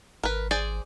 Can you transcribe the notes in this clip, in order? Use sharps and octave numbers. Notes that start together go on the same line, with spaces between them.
G#1 A#4 B4
G#4 C5 D5